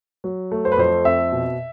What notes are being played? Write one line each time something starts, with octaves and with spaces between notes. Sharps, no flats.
F#3
A3
C5
B4
F2 C5
C4 E5
B2